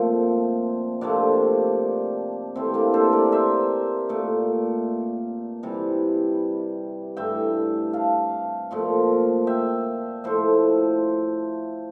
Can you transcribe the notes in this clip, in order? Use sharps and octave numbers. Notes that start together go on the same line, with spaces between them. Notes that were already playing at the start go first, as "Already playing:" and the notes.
Already playing: A#2 F3 A3 C4
C3 F3 A3 A#3 D4
C3 E3 A3 C4
A#3 D4
A4 C5
A#4 D5
C5 E5
A#2 A3
C3 E3 G3
G2 E3 A3 E5 G5
F5 A5
A#2 F3 A3
E5 G5
A2 F3 A3 C5 E5